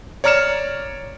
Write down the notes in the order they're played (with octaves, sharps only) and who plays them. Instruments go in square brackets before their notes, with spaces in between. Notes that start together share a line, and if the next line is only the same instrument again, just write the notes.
[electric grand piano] C#5 D5 A#5 F6 C#7 E7